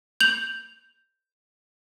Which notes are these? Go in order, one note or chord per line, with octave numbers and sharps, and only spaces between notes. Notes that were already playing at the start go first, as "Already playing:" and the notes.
G6 F7 F#7